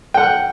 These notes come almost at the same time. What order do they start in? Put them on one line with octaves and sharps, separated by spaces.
G5 F#5 F#6